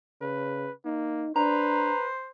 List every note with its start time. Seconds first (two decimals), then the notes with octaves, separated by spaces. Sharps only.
0.21 C#3 B4
0.85 A#3 D#4
1.36 D4 B4 C5 A#5